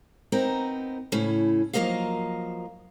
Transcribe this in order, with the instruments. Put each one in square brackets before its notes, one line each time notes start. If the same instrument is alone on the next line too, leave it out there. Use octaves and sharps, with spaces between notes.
[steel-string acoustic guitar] B3 C4 D#4 A#4
A2 C#3 C#4 E4
F3 F#3 A#3 A#4 D#5 F5